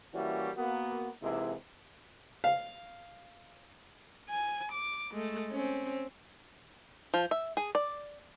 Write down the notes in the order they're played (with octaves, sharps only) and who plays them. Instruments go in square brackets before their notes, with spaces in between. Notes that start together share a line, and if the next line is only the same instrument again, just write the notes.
[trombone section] E3 G3 A#3 C#4 E4 F#4
A#3 B3 F#4
C3 E3 G#3 A#3 D#4 E4
[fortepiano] F5
[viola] G#5
D6
G#3 A3
C4 C#4
[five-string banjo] F3
E5
G#4
D5